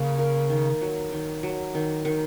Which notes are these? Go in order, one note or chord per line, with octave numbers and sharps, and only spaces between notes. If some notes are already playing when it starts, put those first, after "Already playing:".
Already playing: C#3 A#3
A#4
D#3
F#3
D#3
F#3
D#3
D#3